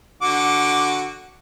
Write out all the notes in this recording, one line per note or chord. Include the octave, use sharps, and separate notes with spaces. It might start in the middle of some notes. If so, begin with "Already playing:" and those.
D3 F#4 D6